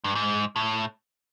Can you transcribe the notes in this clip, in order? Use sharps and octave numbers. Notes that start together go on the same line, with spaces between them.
G2
G#2
A2